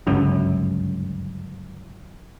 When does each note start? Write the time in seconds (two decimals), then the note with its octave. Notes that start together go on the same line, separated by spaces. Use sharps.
0.07 G1 C#2 F#2